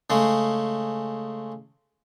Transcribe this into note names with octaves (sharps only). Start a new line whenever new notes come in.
C#3 G#3 A3